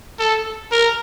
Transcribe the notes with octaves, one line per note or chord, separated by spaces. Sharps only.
A4
A#4